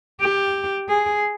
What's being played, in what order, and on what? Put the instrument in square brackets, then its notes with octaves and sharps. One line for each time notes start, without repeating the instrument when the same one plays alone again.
[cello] G4
G#4